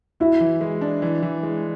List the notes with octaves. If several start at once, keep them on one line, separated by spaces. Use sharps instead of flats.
E4 F#4
E3
G#3
D4
E3
E3
G#3